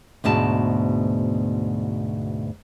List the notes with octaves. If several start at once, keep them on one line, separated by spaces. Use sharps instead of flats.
D2 G#2 B2 A5